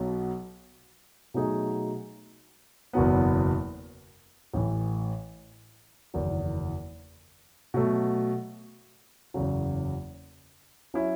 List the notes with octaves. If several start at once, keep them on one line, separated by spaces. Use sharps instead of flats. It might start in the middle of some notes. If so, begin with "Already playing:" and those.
Already playing: B1 B2 F#3
B2 F#3 A3 D#4 G#4
F#1 E2 B2 F#3 B3
A1 A2 E3
F#1 E2 D#3 F#3
B2 F#3 A3
F#1 E2 C#3 F#3
F#3 C#4 E4